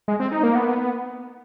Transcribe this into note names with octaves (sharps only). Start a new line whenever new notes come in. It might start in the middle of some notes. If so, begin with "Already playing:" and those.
G#3
C4
D#4
A#3
B3